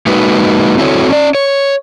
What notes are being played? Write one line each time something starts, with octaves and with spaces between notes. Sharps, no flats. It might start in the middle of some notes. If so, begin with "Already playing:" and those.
G#3 A#3 D#4 F#4 B4
C4 E4 F#4 A4 C#5
C#4 C#5 D5
C#5